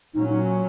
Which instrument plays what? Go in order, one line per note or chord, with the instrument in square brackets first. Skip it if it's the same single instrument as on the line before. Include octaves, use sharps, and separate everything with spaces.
[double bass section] A#2 F#3 C#4 [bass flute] D#4
[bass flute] D#4